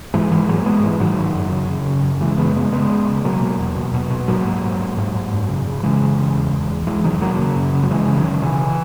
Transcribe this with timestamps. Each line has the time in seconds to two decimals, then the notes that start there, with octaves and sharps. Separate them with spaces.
0.14 G#2 E3 G#3
0.31 G#2 E3 G#3
0.48 G#2 F#3 A#3
0.65 G#2 G#3 B3
0.82 G#2 E3
1.00 G#2 D#3 F#3
1.18 C#3
1.35 F#2
1.51 C#3
1.69 C#3
1.86 F#2
2.04 F#2
2.21 C#3 E3 G#3
2.38 F#2 G#3 B3
2.55 C#3 G#3 B3
2.72 C#3 G#3 B3
2.90 C#3
3.07 C#3
3.24 B2 F#3 A#3
3.42 B2
3.59 E2
3.76 B2
3.94 B2
4.10 B2
4.27 G#2 F#3 A#3
4.45 G#2
4.63 G#2
4.79 G#2
4.97 G#2
5.15 G#2
5.32 F#2
5.49 C#3
5.66 C#3
5.83 C#3 E3 G#3
6.01 F#2
6.18 C#3
6.35 E2
6.53 E2
6.70 E2
6.87 E2 E3 G#3
7.04 B2 D#3 F#3
7.21 B2 F#3 A#3
7.39 C#3
7.56 F#2
7.73 C#3
7.83 F#3
7.90 C#3 E3 G#3
8.08 C#3
8.16 D#3 F#3
8.25 C#3
8.42 B2 E3